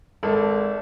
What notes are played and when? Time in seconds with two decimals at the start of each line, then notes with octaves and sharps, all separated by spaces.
0.23 G#1 A4